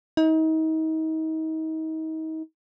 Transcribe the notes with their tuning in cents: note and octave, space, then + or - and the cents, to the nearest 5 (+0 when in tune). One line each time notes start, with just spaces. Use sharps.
D#4 +35